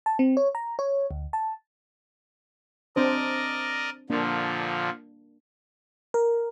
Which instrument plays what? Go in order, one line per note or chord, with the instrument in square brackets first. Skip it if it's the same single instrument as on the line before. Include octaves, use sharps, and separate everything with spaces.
[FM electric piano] A5
C4
C#5
A#5
C#5
D2
A5
[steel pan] C4 D4 C5 [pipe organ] A#4 D5 D#5
[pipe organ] A#2 D3 F3 [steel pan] A#3 D4
[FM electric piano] A#4